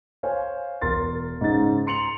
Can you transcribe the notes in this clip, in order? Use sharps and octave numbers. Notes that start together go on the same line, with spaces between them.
C5 C#5 F5 G#5
E1 A#4 C6 A6
G#2 C#3 D#4 A6
A#5 C6 C#7 F7 F#7